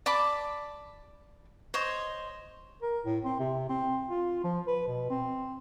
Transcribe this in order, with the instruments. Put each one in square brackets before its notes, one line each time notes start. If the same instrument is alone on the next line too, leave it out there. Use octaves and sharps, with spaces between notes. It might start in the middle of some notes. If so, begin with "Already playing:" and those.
[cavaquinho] D5 A5 B5 D6
C5 C#5 D#5
[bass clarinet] A#4
A2
C4
C3
C4
F4
F3
B4
B2
C4